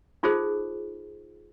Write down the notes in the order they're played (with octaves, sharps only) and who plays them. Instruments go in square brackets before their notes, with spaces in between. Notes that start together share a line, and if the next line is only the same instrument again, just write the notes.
[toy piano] D#4 F4 G#4 A4 C5